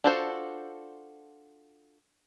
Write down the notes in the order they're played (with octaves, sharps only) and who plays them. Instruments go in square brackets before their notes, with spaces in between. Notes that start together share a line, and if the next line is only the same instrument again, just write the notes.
[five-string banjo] D4 F4 F#4 A4 C5